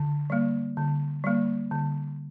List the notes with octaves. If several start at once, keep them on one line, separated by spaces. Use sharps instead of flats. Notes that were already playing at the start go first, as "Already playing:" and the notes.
Already playing: D3
G3 A#3
D3
G3 A#3
D3